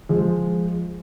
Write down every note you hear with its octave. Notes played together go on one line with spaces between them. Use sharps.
F3 G#3